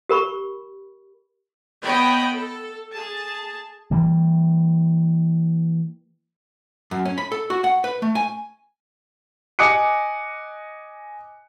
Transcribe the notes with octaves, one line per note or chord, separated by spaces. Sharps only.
G4 A#4 B5 C#6
B3 C#5 D#5 G5 B5
A4
G#4 A5
E3 G3 A#3
F#2
C#4
B5
A4
F#4
F#5
B4
A3
G#5
D#5 G#5 D6 D#6 F#6 C#7